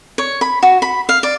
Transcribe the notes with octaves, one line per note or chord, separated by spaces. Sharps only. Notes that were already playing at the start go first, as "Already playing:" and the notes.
C#5
B5
F#4
B5
F5
D5